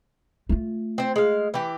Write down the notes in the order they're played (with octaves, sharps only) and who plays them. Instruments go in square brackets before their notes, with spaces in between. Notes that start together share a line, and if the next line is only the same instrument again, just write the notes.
[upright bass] A3 F4
[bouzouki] C4 C5
G#3 F5
E3 G4